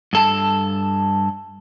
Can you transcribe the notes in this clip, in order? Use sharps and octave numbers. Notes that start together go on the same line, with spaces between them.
G2 A4 A5